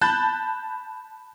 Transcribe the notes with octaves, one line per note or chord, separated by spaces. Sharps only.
A5 B5 F#6 G6 A6